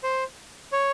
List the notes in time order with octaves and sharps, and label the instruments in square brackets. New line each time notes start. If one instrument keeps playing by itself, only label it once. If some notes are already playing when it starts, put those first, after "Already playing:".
[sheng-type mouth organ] C5
C#5